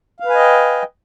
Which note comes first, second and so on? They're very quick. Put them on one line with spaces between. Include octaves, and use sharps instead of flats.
F5 B4 G#5 D#5 G5